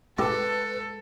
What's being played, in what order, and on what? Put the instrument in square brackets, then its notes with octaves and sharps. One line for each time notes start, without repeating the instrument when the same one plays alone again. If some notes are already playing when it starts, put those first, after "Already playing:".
[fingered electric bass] G#3 [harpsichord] E4 G4 [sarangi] A4 [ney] B4